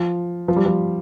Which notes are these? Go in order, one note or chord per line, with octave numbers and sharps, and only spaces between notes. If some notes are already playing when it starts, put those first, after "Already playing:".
Already playing: F3
F3
G3
F3